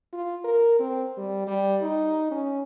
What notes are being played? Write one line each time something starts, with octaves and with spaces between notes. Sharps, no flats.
F4
A#4
C4
G3
G3
D#4
C#4